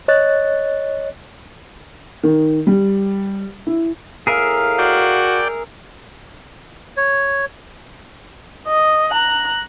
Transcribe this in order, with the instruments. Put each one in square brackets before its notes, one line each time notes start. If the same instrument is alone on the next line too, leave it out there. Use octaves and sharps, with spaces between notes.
[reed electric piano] C#5 D#5 F#6 A6
[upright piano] D#3
G3
E4
[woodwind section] A2 F5 [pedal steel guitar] G#4 A#4 E5
[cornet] F#4 [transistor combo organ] D5 G5
[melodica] C#5
[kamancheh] D#5
A#5 F#6